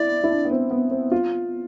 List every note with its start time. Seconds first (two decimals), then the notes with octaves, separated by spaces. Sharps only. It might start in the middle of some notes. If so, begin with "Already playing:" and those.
Already playing: E4 D5
0.24 E4
0.30 D4
0.45 B3
0.51 C4
0.71 B3
0.91 C4
1.12 F4